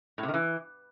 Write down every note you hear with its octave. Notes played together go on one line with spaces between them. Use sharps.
A2
C3
D#3
E3